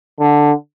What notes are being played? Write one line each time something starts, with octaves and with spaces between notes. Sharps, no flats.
D3